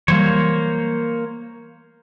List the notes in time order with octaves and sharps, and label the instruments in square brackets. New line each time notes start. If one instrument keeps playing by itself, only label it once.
[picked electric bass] E3 F#3 G3 [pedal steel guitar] A#3 C5 C#5